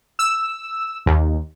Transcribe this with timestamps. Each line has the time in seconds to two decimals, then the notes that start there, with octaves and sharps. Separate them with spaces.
0.19 E6
1.06 D#2